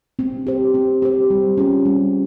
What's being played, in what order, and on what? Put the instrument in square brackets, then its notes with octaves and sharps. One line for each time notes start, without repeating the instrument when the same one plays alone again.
[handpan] C4
G4 C5
C4
G4 C5
G3
C#4 F4 G#4
G3